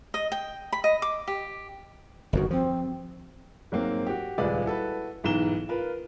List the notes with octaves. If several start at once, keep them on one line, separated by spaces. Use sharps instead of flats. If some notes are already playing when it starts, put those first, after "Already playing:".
D#5
G5
B5
D#5
D6
G4
G1 F2 D#3 F#4
F3 C4
G#2 F#3 A#3 C4
F#4 G4
D#1 C#2 G#3 B4 D5
E4 F#4 A4 B4
B1 G#2 E3 A#5 E7 G7
F4 A#4 B4